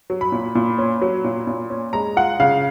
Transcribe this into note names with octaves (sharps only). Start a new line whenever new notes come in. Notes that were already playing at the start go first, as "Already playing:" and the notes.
F#3
B5
A#2
A#2
C#4
F#3
A#2
A#2
C#4
G#3 A#5
F4 F#5
C#3 F5